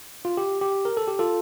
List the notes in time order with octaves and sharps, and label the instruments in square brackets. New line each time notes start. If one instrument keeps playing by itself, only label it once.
[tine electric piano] F4
G4
G4
A#4
A4
G4
F4 A4